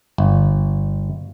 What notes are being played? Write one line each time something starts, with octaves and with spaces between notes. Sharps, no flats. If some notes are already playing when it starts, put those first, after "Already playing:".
G1